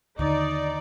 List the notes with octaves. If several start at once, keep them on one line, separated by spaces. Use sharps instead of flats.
D#2 D3 D#4 D5